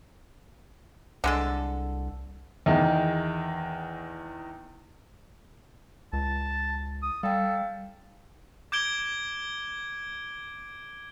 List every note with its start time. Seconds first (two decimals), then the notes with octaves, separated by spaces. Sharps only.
1.24 C2 D3 G#3 A4
2.66 E2 D#3
6.13 C#2 A5
7.03 D#6
7.23 G3 A4 F5 G5
8.72 D6 G6 G#6 D7 G7